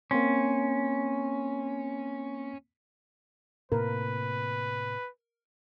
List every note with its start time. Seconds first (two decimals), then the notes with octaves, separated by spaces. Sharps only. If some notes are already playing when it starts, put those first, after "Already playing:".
0.11 A#3 C4 C#4 C6
3.72 A2 C3 A#3 A#4 B4